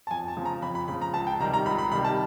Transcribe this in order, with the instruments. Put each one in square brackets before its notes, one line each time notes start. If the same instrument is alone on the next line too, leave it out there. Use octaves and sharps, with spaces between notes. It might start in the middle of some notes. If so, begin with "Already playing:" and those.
[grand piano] A5
F2 G#5
A5
C#3 F3
A#5
F2 B5
B5
C#3 F3 B5
A#5
C#2 A5
G5
C3 D#3 G3 A#5
A#5
C#2 B5
B5
C3 D#3 G3 B5
A5